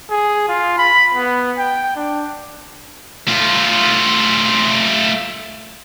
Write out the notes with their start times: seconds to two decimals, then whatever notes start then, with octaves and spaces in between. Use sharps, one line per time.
0.11 G#4
0.49 F4
0.78 B5
1.15 B3
1.58 G5
1.96 D4
3.28 A3 F4